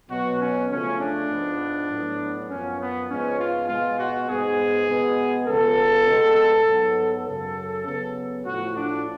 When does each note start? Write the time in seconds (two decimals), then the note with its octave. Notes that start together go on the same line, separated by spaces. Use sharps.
0.10 B2 F#3 B3 F#4
0.40 C#4
0.69 C#3 F3 A3 C#4
1.00 D4
1.30 G#2 F3 B3
1.90 A2 F#3 B3
2.49 F#2 F3 B3 C#4
2.79 B3
3.09 G#2 F3 G#3 B3 C#4
3.39 F4
3.68 B2 G#3 B3 F4
3.99 F#4
4.28 G#2 G#3 B3 G#4
4.88 B2 G#3 B3
5.47 C#3 F3 B3 A4
6.07 B2 G#3 B3
6.67 G#2 F#3 B3
7.27 F#2 C#3 F#3 A4
7.87 C#3 F#3 B3 A4
8.46 A2 F3 A3 F#4
8.76 D4